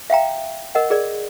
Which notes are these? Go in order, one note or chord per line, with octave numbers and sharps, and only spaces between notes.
E5 F5 G5 A#5
A#4 D#5 F#5
G#4 A#4 D5